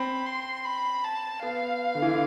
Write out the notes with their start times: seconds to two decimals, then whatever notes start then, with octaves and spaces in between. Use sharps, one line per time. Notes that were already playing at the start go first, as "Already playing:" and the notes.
Already playing: C4 B5
0.26 C6
0.65 B5
1.04 A5
1.43 B3 F5
1.95 D3
2.02 E3
2.10 D3